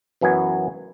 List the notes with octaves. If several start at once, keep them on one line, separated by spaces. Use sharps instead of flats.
F#2 E3 F#3 B3 G#5